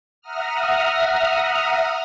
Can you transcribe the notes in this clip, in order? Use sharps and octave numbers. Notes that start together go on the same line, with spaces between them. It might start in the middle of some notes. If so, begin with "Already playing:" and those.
E5 F#5 A#5 D#6 F6